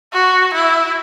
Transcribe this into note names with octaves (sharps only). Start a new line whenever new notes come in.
F#4
E4